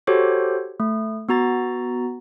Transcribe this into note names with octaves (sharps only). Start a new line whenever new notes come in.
F#4 G4 A4 C5 C#5
A3
B3 F#4 A#5 A6